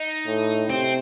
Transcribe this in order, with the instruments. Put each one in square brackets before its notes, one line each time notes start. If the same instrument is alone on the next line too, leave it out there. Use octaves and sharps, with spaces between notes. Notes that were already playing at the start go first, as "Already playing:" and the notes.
Already playing: [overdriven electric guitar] D#4
[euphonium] A2
[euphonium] C3 [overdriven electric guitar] C4